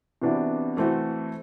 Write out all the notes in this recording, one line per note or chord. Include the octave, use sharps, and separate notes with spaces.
C3 E3 B3 D4 F#4
E3 A3 C4 F#4